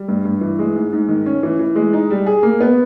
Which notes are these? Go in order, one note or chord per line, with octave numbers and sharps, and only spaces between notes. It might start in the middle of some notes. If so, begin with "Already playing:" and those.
Already playing: G3
G2
G2
E3
G#3
G#2
G#2
D#3
C#4
E3
E3
G#3
D#4
G3
G#4
A#3
B3